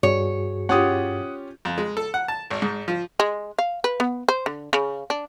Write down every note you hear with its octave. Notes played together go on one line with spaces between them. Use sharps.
G2 F#4 G#4 C#5
C#4 F4 G4 F#5 D#6
F2
G#3
A4
F#5
A5
G#1
G#2
F3
G#3
F5
B4
B3
C5
D3
C#3
D4